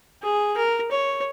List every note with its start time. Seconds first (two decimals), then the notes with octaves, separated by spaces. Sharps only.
0.23 G#4
0.57 A#4
0.91 C#5